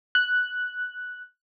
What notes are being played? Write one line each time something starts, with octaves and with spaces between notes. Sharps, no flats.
F#6